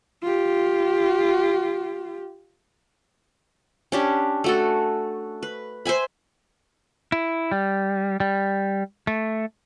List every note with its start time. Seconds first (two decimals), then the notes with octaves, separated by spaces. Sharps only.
0.23 F4 G4
3.92 C#4 D4 G4
4.44 A3 F#4 A4
5.43 B4
5.85 C5 E5 G#5 B5
7.12 E4
7.52 G3
8.20 G3
9.07 A3